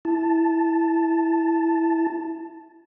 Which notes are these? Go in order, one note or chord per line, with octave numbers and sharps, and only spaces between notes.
E4 A5